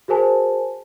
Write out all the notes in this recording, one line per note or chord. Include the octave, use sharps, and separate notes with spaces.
F#4 G#4 A#4 C5 G#5 A5